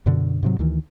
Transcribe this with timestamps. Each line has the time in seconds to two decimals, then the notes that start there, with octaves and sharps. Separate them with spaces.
0.06 F#2 B2 D3
0.43 G#2 C3 F#3
0.59 D2 D#3 E3